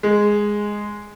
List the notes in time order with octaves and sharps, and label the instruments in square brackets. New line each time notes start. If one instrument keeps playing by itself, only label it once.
[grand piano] G#3